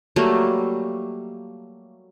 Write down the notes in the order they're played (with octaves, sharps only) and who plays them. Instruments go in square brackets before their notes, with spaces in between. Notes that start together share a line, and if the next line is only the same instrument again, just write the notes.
[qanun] F#3 G3 A3 A#3